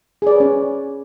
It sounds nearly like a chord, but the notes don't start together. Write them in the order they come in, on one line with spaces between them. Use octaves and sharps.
G#4 D5 B4 C#5 C#4